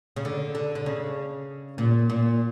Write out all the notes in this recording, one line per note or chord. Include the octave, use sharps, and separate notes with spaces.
C#3
D3
D3
D3
C#3
A#2
A#2